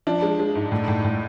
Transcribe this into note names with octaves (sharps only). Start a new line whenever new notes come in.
F3 D4
G#3
G#3
G#2
A2
A2
A2